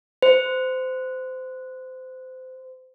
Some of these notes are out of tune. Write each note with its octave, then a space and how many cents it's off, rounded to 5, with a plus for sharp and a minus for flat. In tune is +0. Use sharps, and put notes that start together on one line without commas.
C5 -25